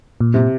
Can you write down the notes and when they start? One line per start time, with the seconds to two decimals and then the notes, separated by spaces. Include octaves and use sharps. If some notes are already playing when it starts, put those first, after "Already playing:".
0.21 A#2
0.34 C3